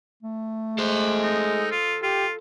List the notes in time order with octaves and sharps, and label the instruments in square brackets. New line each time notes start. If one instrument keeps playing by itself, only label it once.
[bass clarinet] A3
[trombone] G#3 [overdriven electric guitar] A4 C5
[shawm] D#4
F4
[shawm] F4 [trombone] G4